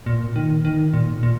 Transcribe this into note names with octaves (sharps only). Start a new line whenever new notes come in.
A#2
D#3
D#3
A#2
A#2